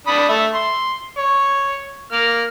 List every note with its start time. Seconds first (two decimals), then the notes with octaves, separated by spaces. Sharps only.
0.07 D4 B5 D#6
0.29 A3 E5
0.54 C6
1.17 C#5
2.12 A#3 F6